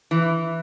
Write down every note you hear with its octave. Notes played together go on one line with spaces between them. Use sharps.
E3